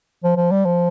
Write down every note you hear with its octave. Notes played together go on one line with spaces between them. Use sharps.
F3
F3
G3
F3